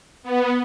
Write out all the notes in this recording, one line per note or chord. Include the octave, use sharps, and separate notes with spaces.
B3